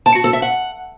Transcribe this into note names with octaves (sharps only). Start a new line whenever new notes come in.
A5
F#4
A4
E5
F#5